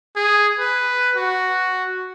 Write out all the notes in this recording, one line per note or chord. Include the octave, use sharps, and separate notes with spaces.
G#4
B4
F#4